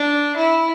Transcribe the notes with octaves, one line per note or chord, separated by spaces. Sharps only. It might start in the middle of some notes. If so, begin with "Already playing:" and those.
Already playing: D4
E4